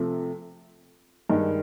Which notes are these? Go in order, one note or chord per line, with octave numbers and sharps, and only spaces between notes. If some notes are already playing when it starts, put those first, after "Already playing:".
Already playing: C3 F3 A3
G2 D#3 G#3